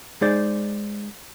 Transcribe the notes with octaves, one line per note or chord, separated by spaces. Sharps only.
G#3 D#4 G#4 C5 D5